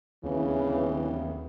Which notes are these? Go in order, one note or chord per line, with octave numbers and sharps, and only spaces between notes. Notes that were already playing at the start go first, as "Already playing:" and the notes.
D1 D#2 C#3 E3